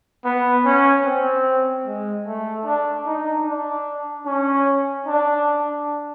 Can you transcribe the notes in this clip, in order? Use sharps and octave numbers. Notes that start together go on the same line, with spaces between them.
B3
C#4
C4
G#3
A3
D4
D#4
D4
C#4
D4